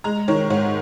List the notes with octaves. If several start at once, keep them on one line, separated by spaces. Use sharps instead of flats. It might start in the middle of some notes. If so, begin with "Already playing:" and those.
G#3 A#5
D#3 C#5
G#2 C#5